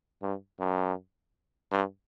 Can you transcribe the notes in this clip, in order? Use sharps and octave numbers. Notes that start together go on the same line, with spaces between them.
G2
F#2
G2